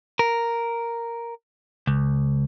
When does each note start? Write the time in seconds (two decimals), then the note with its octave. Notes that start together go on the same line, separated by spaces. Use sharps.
0.19 A#4
1.87 C#2